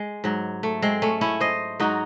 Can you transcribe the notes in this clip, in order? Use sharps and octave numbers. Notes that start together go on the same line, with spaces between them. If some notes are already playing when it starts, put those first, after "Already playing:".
Already playing: G#3
G#2 F#3
A3
G#3 C4
A3 C#4
C#4 E4
C5 D#5
G#2 F#3 D#4 F#4